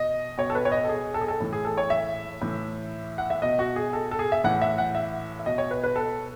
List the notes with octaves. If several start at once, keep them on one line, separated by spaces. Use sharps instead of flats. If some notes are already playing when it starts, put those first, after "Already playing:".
Already playing: B2 D#5
B2 C#5
A4
B4
C#5
D#5
A4
G#4
A4
G#4
A4
A2 E3
G#4
A4
C#5
E5
A2 E3
F#5
E5
B2 D#5
F#4
G#4
A4
A4
G#4
E5
A2 E3 F#5
E5
F#5
E5
E5
B2 D#5
C#5
B4
B4
A4